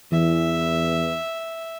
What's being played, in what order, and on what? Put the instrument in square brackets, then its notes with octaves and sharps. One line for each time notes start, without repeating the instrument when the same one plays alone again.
[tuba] E2 [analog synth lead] E3 [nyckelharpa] E5